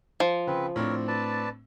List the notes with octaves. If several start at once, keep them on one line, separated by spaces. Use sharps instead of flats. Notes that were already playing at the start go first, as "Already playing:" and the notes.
F3
C#3 C4 B4
A2 C4 D4 A#4 C#5
B4 D5 A5